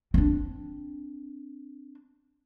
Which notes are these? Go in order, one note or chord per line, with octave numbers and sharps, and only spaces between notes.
C4 D4